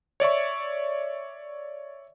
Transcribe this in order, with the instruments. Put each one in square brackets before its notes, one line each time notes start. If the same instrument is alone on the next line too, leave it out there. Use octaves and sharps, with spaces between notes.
[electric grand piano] C#5 D5 E5 C#6